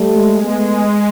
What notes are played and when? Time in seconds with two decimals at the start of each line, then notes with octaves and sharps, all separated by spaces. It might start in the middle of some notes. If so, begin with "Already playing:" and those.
Already playing: G3 A3
0.16 G#3
0.42 A3 B3